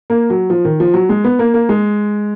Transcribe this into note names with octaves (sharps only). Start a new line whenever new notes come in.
A#3
F#3
F3
D#3
F3
F#3
G#3
B3
A#3
A#3
G#3